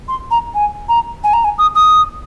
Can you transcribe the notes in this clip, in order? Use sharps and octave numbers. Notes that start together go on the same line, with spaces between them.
C6
A#5
G#5
A#5
G#5
A#5
G#5
D#6
D#6